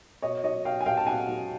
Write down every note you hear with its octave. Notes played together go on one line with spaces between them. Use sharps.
B2 C#5 D#5
F#3 C#5 D#5
B2 F5 G5
G#5
F#3 F5 G5
A5
B2 F#5 G#5
F#3